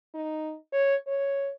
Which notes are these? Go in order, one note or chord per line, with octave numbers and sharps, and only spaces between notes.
D#4
C#5
C#5